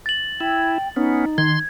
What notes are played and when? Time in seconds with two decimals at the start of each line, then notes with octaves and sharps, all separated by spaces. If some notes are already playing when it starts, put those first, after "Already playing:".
0.06 A6 F#7
0.41 E4 G5
0.96 B3 C#4 D#4
1.38 D#3 C6 G#6